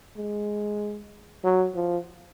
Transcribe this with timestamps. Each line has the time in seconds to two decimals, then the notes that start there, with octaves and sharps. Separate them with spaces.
0.17 G#3
1.44 F#3
1.76 F3